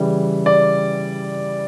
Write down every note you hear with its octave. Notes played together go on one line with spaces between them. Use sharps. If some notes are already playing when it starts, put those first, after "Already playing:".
Already playing: C#3 E3 G3
D5